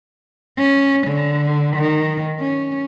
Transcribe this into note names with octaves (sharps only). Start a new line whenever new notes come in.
C#4
D3
D#3
C#4